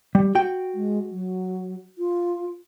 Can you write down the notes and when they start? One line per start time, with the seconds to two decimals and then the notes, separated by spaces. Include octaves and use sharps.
0.15 G3
0.35 F#4 G5
0.74 G#3
1.11 F#3
1.98 F4